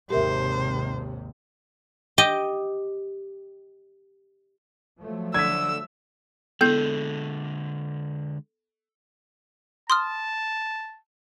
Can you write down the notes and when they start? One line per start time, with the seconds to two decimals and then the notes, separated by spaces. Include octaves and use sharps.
0.10 G#1 D#2 C3 G4 A#4 C5 E5
2.18 G4 D#5
5.00 F3 F#3 A3
5.34 D3 E6 G#6 B6
6.61 D3 G#3 B3 E4 A4 G6
9.90 A5 C6 D#6 F6